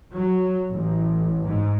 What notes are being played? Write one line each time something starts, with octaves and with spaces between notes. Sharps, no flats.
F#3
A1
G#2